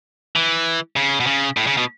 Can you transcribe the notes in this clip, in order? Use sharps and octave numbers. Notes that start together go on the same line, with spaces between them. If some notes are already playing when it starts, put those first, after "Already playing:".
E3
C#3
B2
C#3
A2
C#3
B2